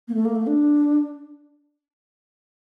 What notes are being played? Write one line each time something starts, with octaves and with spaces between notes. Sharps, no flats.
A#3
A3
A#3
A3
D4